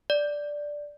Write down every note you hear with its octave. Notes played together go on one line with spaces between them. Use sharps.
D5